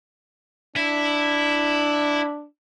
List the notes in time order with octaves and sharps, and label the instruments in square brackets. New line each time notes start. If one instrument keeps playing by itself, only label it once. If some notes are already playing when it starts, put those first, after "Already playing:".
[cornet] D4 [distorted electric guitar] E4